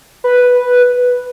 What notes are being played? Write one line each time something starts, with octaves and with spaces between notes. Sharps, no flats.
B4